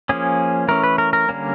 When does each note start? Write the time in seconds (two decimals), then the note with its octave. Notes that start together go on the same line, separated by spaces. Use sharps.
0.09 F3 A#3 C#4 G#4
0.68 E3 A3 C#4 A#4
0.83 B4
0.98 A#4
1.13 A#4
1.29 D3 G3 A#3 C#4